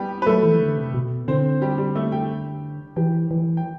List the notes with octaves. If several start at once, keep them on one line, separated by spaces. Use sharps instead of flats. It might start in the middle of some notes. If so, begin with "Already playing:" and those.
Already playing: G3 B3 G4
B4
F#3 A3 A4
E3
D3
C3
B2
D3 C4 C5
G3 G4
G3 G4
A3 A4
G4 G5
E3 G4 G5
E3
G5